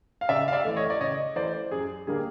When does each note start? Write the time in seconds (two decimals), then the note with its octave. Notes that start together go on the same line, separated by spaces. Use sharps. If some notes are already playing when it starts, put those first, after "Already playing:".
0.21 F5
0.29 C#3 D5 E5
0.48 F5
0.52 D5 E5
0.64 E3 A3
0.76 C#5 D#5
0.90 D5
1.01 C#3 C#5 D#5
1.36 E3 A3 C5 D5
1.71 F#2 G#4
2.07 D3 G3 A#3 G#4